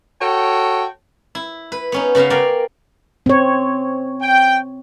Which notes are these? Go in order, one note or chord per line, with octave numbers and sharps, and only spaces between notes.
F#4 A4 C#5 G5
E4
B4
B3 C#4 D#4
C#3 B3 F#4 E5 F5
A#4 D5 F5 G5 G#5
C4 C#5
G5